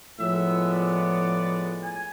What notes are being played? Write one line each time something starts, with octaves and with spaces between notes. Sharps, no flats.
A2 F3 G#3 B3 E5
D5
G#5